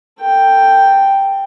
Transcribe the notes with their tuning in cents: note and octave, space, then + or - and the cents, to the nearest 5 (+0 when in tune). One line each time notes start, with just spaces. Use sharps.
A4 +35 G5 +0